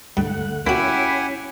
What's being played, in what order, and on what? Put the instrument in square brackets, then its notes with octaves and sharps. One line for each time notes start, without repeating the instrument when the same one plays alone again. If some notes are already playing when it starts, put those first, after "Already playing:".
[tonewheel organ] D2 A3 F#5 [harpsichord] G2
[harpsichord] A#3 F#4 [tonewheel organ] C#4 [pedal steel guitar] E4 [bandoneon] G4 F#5 G#5